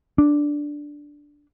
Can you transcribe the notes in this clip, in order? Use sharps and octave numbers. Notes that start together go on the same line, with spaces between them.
D4